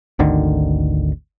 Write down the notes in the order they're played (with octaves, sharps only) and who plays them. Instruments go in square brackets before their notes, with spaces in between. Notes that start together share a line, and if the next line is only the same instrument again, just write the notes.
[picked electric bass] G#1 D2 D3 D#3